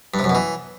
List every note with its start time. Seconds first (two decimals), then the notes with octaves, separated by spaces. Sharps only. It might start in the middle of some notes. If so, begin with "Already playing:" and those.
0.14 G2
0.19 C3
0.24 F#2
0.30 B2
0.35 E3